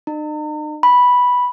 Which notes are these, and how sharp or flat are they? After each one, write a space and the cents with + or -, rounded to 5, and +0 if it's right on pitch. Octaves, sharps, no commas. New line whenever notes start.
D#4 -45
B5 -5